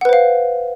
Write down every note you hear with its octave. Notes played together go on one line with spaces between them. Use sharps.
B4 C5 F5 F#5